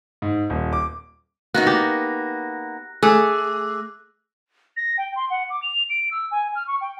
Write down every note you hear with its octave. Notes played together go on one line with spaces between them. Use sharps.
G#2
D#1
D6
A#3 B3 D#4 F#4 F#6
G4 A#6
A3 G#4 D6 E6 F#6
A#6
G5
C6
F#5
D6
F7
D7
E6
G#5
F6
C#6
G5